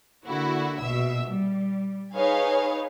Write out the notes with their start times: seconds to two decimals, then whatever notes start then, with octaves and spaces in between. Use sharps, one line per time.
0.26 D3 A#3 E4 F#4
0.80 A#1 B2 E5 E6
1.28 G3
2.13 D#4 G#4 B4 C#5 F5 G#5